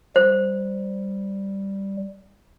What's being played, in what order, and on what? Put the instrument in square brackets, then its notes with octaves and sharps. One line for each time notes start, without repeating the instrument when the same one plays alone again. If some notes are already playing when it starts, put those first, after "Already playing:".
[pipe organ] G3 [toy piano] C5